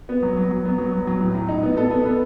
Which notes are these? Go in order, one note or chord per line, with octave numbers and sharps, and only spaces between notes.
B3
F#3
F#3
F#3
B3
F#3
F#3
F#3
A2
A2
D#4
B3
B3 A4
B3
B3